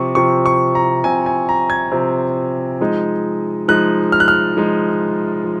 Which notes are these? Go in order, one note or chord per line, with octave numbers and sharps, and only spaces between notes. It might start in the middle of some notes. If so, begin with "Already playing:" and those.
Already playing: C3 F3 C4 C#6
C3 F3 C4 C#6
C#6
A#5
C3 F3 C4 G#5
G#5
A#5
G#6
C3 F3 C4
F3 G#3 D#4
F3 G#3 D#4 F#6
F6
F#6
F6
F3 G#3 D#4
F3